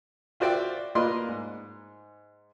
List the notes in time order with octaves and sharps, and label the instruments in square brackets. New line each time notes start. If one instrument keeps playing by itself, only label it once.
[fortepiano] F4 F#4 C5 D5 E5 G5
A#3 F4 B4 D5 D#5 C6
G#2